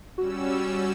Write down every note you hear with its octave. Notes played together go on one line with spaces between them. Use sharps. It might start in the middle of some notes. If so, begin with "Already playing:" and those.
G3 C#4 F#4 E6